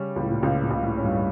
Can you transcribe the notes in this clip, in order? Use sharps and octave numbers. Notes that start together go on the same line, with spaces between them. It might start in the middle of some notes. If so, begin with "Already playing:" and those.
Already playing: C#3 G3 C#4
C#2 A2
A#2
C#2 C#3
A#2
C#2
A2
C#4
G2